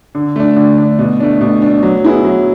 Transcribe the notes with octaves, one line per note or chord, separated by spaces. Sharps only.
D3
A3 D4
D3
A3 D4
B2
A3 D4
B2
A3 D4
F#3
B3 E4 G#4
F#3